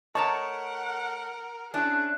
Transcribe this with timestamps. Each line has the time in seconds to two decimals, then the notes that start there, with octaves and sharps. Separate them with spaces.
0.15 A3 A#4 C#5 D#5 F#5 A5 A#5 C#6
1.74 C#4 D4 E4 G#4 F#6